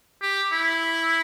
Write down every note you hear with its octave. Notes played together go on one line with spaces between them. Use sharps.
G4
E4